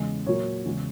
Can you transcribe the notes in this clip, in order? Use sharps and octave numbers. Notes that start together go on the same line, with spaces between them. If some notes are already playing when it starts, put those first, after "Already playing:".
Already playing: E2 C#3 G#3
A#2 F#3 A#3 C#5
E2 C#3 G#3